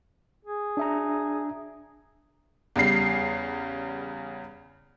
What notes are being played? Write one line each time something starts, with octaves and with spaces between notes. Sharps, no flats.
G#4
D4 E5 A#5
E2 C#3 G3 C7